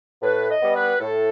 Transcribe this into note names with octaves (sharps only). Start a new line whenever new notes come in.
A2 B4
D#5
G3 B3
B4
A2 A4